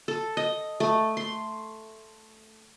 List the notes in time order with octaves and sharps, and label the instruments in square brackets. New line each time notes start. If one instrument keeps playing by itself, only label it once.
[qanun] A4
D#5
A3
C6